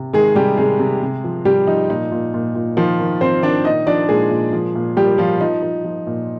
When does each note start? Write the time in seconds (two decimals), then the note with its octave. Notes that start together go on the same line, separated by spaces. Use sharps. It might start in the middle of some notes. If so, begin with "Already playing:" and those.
Already playing: C3
0.13 D#3 G#3 G#4
0.35 C3 G3 G4
0.57 C3 G#3 G#4
0.79 C3
1.02 C3
1.24 F3
1.45 C3 G3 G4
1.67 F3 D#4
1.90 A#2 D#4
2.12 A#2
2.34 A#2
2.55 A#2
2.77 D#3 F3 F4
2.99 D#3
3.21 D#3 C4 C5
3.43 D#3 D4 D5
3.65 A#2 D#4 D#5
3.86 F3 D4 D5
4.08 A#2 G#3 G#4
4.31 A#2
4.53 F3
4.75 A#2
4.96 F3 G3 G4
5.18 F3 F4
5.41 F3 D#4
5.63 F3
5.85 F3
6.07 A#2